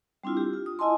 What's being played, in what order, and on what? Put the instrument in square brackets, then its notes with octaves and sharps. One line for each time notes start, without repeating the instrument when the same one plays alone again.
[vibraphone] G3 C4 D4 E4 F4
G4
F4
D#6
E4 F4 D#5 G#5 A5 C6